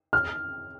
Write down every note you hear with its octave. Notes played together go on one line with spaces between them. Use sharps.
F6